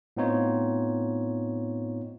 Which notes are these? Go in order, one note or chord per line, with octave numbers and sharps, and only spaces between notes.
A2 B3 C4 D#4 F4 C#5